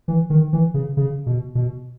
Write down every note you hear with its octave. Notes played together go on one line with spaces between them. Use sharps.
E3
D#3
E3
C#3
C#3
B2
B2